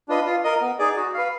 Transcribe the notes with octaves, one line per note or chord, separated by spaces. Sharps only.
D4 F4 B4 D#5
F4
A#4 D#5
B3
D#4 G#4 D5
F#4
B4 F5